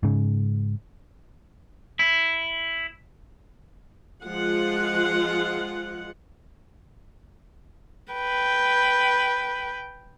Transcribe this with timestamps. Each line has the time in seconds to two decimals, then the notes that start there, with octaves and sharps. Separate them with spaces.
0.03 G#2 C#3
1.99 E4
4.25 F3 G#3 F4 F#5
8.13 B4 G5